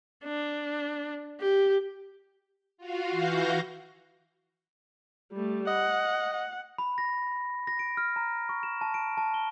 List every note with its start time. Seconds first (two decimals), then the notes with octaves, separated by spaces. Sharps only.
0.24 D4
1.41 G4
2.78 F4 F#4 F5
3.11 E3 F#4 F5 G6 A#6
5.33 G3 A3
5.68 D#5 F#5
6.34 F#5
6.78 B5
6.98 A#6
7.67 A#6
7.79 D7
7.97 F6
8.16 A#5
8.49 C#6
8.63 E7
8.81 A5
8.94 D7
9.17 A5
9.34 G7